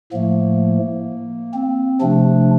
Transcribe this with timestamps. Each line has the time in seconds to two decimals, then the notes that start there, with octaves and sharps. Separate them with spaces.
0.12 A2 F3 A3 A#3
1.54 C4
2.01 C3 F3 A3 D4